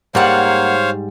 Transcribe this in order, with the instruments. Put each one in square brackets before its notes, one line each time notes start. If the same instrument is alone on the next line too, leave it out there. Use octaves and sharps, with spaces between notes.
[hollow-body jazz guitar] G#2 G3 [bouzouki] A#3 F#5 [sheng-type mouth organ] C5 C#5 F5